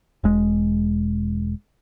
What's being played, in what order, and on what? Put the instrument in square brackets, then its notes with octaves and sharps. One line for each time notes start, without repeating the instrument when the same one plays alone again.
[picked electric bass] E1 G#3